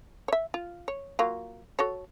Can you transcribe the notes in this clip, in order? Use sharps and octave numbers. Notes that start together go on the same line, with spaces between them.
C#5 E5
F4
C#5
F#3 A#3 F4
F#4 A4 C#5